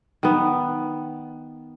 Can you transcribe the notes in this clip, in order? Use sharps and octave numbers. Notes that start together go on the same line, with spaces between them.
D#3 B3